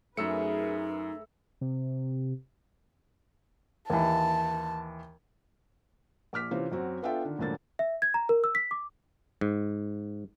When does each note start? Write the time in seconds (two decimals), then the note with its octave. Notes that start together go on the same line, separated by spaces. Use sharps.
0.17 F#2 A3 D#4 G#4 A#4 B4 E6 C#7
1.61 C3
3.90 D#2 E3 A5
6.33 A#1 D6 F6 B6
6.51 C3 E3 C#4 F4 C5
6.72 F#2 C4 F#4
7.02 B3 D4 F4 A4 E5 G5
7.25 D3 D#3
7.38 E1 F2 A2 D3 A#3 A6
7.79 E5
8.02 G#6
8.14 A#5
8.29 A#4
8.44 E6
8.55 B6
8.71 D6
9.41 G#2